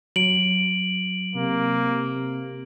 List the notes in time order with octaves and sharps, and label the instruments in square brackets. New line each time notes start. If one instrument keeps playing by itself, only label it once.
[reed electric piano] F#3 [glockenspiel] D7 F#7
[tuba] C3 [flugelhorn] A#3